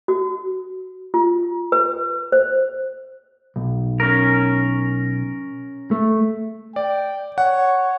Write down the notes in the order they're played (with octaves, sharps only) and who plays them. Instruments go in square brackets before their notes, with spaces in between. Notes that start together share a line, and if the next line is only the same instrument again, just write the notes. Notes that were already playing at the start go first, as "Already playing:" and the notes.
[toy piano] F#4
F4
B4
C5
[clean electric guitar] B1
[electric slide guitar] C#4 A#4
[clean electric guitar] A3
[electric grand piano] D5 [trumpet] G5
[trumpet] C#5 [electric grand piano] F#5